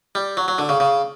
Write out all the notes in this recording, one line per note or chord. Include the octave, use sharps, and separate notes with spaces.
G3
F#3
F#3
D3
C#3
C#3